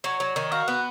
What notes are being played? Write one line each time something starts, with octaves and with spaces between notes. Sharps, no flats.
F#3 C#5
F#3
D#3
F#4 F5
B3 F#5